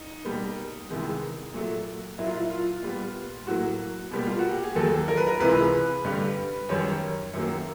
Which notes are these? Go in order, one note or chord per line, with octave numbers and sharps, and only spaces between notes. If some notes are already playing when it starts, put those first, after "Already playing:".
Already playing: D#4
B2 G3 A#3
C2 C3 D#3 G#3 B3
A#2 F#3 A3
A#2 F#3 A#3 E4
F4
E4
F4
A#2 G3 B3
A2 F#3 A#3 F#4
B2 G3 A#3
F4
F#4
G4
G#4
D#2 D#3 F#3 A#3 A4
A#4
B4
A#4
C#2 C3 E3 G#3 B4
G2 D3 G3
F#2 D#3 G3 C#5
F#2 D#3 F#3 A#3